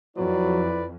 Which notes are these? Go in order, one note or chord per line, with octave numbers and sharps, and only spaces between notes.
F2 F#3 E4 B4 D5